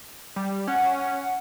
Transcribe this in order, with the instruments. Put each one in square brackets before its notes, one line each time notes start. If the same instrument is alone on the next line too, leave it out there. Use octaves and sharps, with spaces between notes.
[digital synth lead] G3
[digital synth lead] C#4 [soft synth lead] F#5